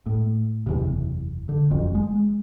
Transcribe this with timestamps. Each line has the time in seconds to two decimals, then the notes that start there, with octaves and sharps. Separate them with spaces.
0.06 A2
0.67 F#1 E2 C3
1.49 D3
1.71 F#1 F2
1.95 G#3